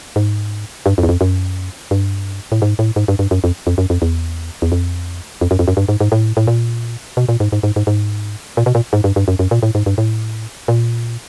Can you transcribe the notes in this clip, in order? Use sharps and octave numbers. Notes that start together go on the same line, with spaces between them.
G#2
G2
F2
E2
F2
F#2
G2
A2
G#2
A2
G#2
G2
G2
F#2
F2
F2
F#2
F2
E2
E2
F2
F2
F#2
F2
F#2
G2
G#2
G#2
A2
A2
A#2
B2
A#2
G#2
G#2
G#2
G#2
G#2
A#2
B2
A#2
G#2
G2
G2
F#2
F#2
A#2
A2
G#2
G2
A2
A#2